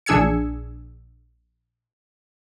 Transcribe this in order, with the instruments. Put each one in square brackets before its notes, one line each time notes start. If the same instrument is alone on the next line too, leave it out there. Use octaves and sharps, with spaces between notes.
[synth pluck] A#1 D4 G#4 E6 G#6 C#7